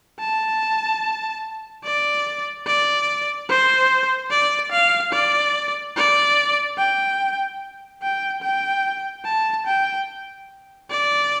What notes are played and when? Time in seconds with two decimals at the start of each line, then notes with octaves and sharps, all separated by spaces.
0.20 A5
1.85 D5
2.67 D5
3.49 C5
4.31 D5
4.72 F5
5.13 D5
5.97 D5
6.78 G5
8.02 G5
8.43 G5
9.25 A5
9.67 G5
10.91 D5